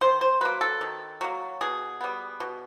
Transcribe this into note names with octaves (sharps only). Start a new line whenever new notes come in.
D#3 C5
C5
F#3 A#3 B4
A4
D#3
F#3 A#3
B2 G#4
G3 B3
B2